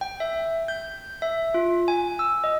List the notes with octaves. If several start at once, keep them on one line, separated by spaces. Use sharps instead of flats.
G5
E5
G6
E5
F4
G#5
E6
D#5